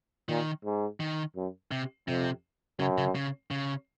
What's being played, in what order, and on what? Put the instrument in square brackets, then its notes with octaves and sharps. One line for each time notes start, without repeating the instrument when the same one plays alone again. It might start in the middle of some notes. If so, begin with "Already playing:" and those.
[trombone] A#2 [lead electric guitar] D#3
[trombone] G#2
[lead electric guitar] D#3
[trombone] F#2
[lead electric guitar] C3
[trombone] F2 [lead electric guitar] C3
[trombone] F#2 [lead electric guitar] C#3
[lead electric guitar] C#3
C#3
C#3